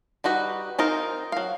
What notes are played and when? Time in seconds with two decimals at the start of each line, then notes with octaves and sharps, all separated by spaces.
0.24 G3 D#4 F#4 B4
0.78 C4 D#4 F4 A#4
1.32 F#3 F5